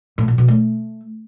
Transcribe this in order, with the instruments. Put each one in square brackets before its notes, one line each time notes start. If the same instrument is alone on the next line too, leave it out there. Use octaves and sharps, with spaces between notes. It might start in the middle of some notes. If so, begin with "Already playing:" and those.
[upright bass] A2
A#2
B2
A3